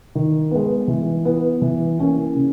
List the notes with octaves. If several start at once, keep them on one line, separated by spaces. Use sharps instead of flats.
D#3
G#3 B3
E3
B3 E4
E3
A#3 C#4 E4
C#3